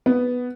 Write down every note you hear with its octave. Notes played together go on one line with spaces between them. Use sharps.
B3